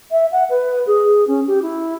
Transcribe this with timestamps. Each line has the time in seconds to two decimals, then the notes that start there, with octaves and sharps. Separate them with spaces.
0.11 E5
0.32 F#5
0.49 B4
0.86 G#4
1.27 C#4
1.47 G4
1.62 E4